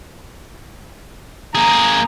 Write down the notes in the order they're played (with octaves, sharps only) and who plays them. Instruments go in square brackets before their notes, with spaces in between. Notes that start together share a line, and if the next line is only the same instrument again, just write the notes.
[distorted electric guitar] A#3 G#4 [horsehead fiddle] A#5